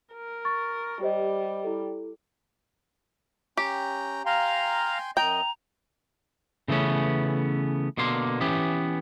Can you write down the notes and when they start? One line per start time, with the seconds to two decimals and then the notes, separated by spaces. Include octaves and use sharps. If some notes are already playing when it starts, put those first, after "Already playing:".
0.14 A#4
0.45 C#6 A6
1.01 G3 G4 C5 D#5
1.64 E4 A4
3.57 C#4 G4 G5 A#5
4.26 F5 G5 G#5 A#5 C6
5.17 F#2 D#5 G5 A#5
6.68 C#3 E3 A3 B3 C#4
7.97 B2 D3 A#3 C6
8.41 E3 B3 C#4 G4